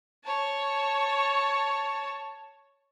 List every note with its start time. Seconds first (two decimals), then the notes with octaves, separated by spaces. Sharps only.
0.25 C#5 A5